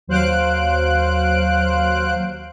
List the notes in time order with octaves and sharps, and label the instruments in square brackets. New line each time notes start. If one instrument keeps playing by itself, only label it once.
[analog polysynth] D#2 F#3 C5 F5 F#6 D7